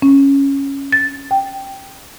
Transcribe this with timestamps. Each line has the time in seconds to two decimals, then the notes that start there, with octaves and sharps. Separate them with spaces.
0.02 C#4
0.92 A6
1.31 G5